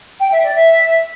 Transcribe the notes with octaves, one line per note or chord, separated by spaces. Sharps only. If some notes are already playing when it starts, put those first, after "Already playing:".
G5
E5
D5
E5